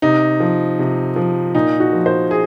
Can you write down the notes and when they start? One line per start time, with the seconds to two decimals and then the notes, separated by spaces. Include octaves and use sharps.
0.02 C3 D#4
0.40 F3
0.79 C3
1.16 F3
1.55 A#2 D#4
1.80 F#4
1.93 F3
2.06 C5
2.31 G#4